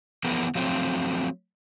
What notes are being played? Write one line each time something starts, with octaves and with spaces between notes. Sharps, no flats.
E3 F3 B3 G#4 A#4
F3 F#3 A3 A#3 C4